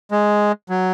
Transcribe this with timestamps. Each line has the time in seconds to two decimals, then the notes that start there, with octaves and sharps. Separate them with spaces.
0.11 G#3
0.69 F#3